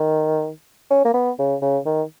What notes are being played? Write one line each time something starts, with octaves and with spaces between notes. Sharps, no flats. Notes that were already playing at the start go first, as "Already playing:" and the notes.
Already playing: D#3
C#4
A#3
B3
C#3
C#3
D#3